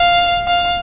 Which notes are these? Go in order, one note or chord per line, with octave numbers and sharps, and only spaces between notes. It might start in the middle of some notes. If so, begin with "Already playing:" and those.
Already playing: F5
F5